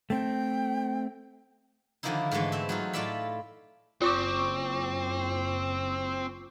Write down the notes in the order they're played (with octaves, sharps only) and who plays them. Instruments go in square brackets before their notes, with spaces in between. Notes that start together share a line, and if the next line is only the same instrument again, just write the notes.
[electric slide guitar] A3 C4 [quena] G5
[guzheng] D3 D#3 F3 A#3 D#4 E4
G#2 D3 E3 G#3 A3
C4 E5
F#3 D#4 F4
A2 F4 A4 D5 E5 B5
[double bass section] F#1 [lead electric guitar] C4 [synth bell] F4 C#6 D6